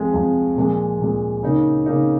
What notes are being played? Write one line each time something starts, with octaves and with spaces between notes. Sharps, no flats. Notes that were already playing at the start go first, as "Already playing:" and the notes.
Already playing: F2 F3 G#3
F2 F3 G#3
A#2 F3 G#3
A#2 F3 G#3
C#3 A#3 D#4
C#3 A#3 D#4